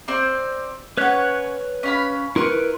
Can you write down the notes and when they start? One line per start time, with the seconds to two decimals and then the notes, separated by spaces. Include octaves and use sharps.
0.08 C4 C5 D5
0.97 C#4 B4 C#5 F#5 F#6
1.83 C#4 F5 B5
2.36 E4 A#4 B4 C6 C#6